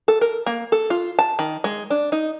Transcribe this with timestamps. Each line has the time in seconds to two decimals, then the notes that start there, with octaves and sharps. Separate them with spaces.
0.08 A4
0.21 A#4
0.46 A#3
0.72 A4
0.90 F4
1.19 A5
1.39 D#3
1.64 G#3
1.90 D4
2.12 D#4